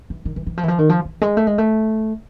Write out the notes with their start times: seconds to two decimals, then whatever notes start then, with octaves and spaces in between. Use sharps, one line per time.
0.10 E3
0.25 D#3
0.36 E3
0.47 E3
0.57 F3
0.63 E3
0.68 F3
0.79 D#3
0.89 F3
1.05 E3
1.21 G#3
1.37 A3
1.47 G#3
1.58 A3